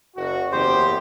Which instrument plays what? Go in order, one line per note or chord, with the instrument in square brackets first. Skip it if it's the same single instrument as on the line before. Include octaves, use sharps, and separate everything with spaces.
[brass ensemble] F#1 F#4
[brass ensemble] F#1 E2 G4 [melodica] C5